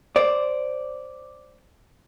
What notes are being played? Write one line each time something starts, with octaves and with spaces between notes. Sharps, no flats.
C5 D5